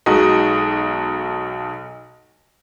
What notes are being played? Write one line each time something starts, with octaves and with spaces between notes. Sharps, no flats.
B1 G#3 D#4 F#4 D#5